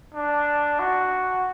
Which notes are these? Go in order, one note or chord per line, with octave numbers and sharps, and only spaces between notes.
D4
F#4